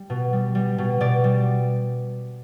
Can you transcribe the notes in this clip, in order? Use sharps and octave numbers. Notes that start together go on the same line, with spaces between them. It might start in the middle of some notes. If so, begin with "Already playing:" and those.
Already playing: G3
B2
G3
G3
B2
B2 D5
G3